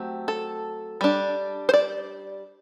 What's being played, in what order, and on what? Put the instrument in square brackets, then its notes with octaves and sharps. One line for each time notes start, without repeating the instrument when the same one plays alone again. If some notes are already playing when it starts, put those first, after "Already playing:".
Already playing: [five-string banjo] F#3 A3 C4 G4
A4
G3 D4
C5
D5